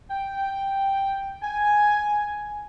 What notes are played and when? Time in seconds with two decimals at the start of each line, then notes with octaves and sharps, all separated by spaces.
0.11 G5
1.43 G#5